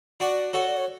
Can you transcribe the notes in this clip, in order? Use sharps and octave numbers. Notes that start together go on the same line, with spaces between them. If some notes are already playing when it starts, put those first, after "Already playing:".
D4 F#4 D5
F#4 A4 C#5
D5
C#5